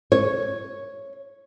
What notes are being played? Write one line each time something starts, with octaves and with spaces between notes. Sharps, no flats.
C#5